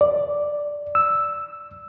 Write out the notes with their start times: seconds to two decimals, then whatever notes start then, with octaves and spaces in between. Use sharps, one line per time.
0.01 D5
0.95 E6